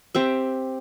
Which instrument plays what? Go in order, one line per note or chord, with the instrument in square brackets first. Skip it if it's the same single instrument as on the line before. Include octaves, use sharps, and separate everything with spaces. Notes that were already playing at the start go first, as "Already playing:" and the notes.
[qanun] C4 G4 E5